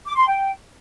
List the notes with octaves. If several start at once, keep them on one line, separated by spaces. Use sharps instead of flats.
D6
C6
G5